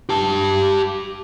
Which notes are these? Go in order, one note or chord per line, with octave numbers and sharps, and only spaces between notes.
G4 A5